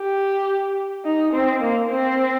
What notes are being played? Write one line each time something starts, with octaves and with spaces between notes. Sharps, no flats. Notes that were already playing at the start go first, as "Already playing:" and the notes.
Already playing: G4
D#4
C4
A#3
C4